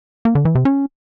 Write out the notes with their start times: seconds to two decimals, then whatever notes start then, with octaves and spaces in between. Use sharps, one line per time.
0.25 A#3
0.35 D3
0.45 E3
0.55 C3
0.65 C#4